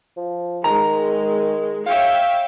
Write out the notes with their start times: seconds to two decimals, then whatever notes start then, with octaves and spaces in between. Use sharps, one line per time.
0.17 F3
0.64 D#3 G#3 A#5
1.86 C#5 E5 F5 G5